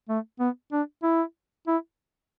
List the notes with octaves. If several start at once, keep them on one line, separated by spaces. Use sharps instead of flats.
A3
B3
D4
E4
E4